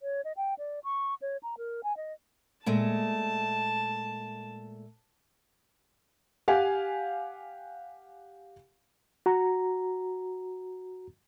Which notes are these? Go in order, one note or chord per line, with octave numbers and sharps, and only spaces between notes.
C#5
D#5
G5
D5
C#6
C#5
A#5
A#4
G#5
D#5
A#2 G#3 A3 A5
G4 F5 F#5 G#5
F#4 A#5